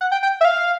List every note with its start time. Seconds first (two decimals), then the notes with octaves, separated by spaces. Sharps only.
0.01 F#5
0.12 G5
0.23 G5
0.41 E5
0.45 F5